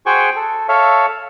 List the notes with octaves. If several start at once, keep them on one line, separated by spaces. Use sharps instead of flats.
F#4 G#4 C5 G5 G#5 C#6
A4
A4 C#5 E5 F5